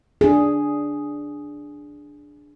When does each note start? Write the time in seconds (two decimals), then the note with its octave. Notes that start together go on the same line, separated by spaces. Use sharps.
0.21 D4 G#4